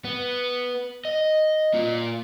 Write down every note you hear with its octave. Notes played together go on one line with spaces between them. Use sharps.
B3
D#5
A#3 F4